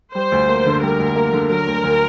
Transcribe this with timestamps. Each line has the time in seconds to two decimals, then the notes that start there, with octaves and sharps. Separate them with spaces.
0.15 G3 C5
0.32 D2
0.48 A#3
0.66 D3
0.82 G3 A#4
0.99 D2
1.16 A#3
1.33 D3
1.50 F#3 A#4
1.67 D2
1.84 D2